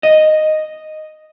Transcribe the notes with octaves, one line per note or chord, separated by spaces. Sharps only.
D#5